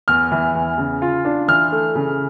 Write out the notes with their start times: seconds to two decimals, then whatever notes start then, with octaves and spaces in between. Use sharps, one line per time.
0.08 E2 F6
0.32 E3
0.55 E2
0.78 C#3
1.02 F4
1.25 D4
1.48 E3 F6
1.72 A3
1.95 C#3